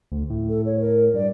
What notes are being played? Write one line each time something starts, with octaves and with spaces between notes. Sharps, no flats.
D2
A2
A4
C#5
A#4
G2 D5